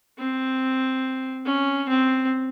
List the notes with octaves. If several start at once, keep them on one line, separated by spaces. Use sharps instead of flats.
C4
C#4
C4